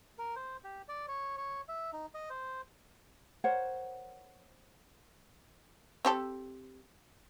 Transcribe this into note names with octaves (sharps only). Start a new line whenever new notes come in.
A#4
C5
G4
D5
C#5
C#5
E5
D#4
D#5
C5
A#4 C5 C#5 F#5
C4 G4 A4